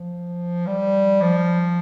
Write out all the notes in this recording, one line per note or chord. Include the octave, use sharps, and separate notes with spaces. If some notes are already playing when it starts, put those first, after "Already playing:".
Already playing: F3
G3
F3